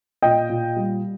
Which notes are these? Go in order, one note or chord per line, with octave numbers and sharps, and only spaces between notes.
A#2 D#5 G5
A#2
G3